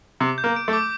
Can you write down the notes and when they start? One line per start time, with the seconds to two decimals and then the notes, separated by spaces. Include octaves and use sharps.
0.20 C3 D6
0.38 G6
0.44 A#3
0.56 D7
0.68 A3
0.73 D6